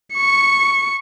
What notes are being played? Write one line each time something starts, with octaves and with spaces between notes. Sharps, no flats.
C#6 C#7